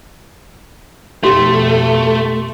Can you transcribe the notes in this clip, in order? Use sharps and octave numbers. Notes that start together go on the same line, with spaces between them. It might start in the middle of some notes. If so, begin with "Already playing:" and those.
F2 B2 A3 G4 C6